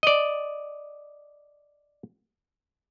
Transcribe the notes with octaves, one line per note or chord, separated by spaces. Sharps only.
D5 D#5